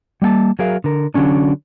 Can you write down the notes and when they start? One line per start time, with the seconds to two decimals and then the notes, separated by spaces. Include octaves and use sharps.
0.22 G3 A#3 F#5 A5
0.59 F#3 G#4 A#4 E5 F5
0.84 D3 A#4
1.14 D3 F#3 C#4 D4